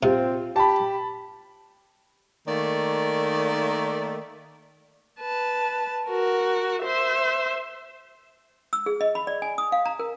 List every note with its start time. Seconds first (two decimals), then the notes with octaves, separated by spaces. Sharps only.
0.03 C3 C4 F4
0.56 G4 A5 B5
2.47 D#3 A3 A#3 D5
5.20 B4 A5
6.07 F#4 A#4
6.83 C5 E5
8.73 E6
8.86 G#4
9.01 D#5
9.15 B5
9.27 D5
9.42 G#5
9.58 D#6
9.72 F5
9.86 A#5
9.99 A#4